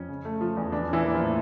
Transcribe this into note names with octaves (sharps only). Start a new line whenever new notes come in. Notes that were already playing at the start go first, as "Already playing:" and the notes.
Already playing: F2 C#4
C#3
A3
F3
E2
E3 D4
E3 C#4 E4
A#3
F3 F4
A2